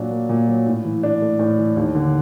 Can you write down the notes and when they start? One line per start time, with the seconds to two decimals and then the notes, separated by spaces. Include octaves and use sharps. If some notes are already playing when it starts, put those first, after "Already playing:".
Already playing: A#2 F#3 D4
0.11 A#3
0.29 A#2
0.48 F#3
0.66 A2
0.85 E3
1.03 D4
1.22 A3
1.39 A2
1.58 E3
1.77 D#2
1.95 D3